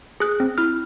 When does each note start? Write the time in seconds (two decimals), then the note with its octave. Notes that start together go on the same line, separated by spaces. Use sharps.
0.20 G#4 F#6
0.40 C4
0.58 E4 F6